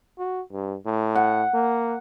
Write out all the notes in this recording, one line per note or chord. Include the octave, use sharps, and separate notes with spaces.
F#4
G2
A2
F#5
A#3